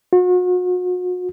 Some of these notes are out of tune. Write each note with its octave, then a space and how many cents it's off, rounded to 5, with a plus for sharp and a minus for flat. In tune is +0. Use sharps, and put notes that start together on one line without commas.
F#4 -40